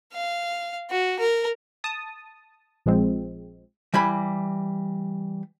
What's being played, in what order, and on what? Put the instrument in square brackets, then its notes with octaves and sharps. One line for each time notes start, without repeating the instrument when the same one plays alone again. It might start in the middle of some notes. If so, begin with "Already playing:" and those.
[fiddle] F5
F#4
A#4
[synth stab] A5 D#6
A#1 F3 G#3 C4
[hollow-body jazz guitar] E3 G3 G#5 B5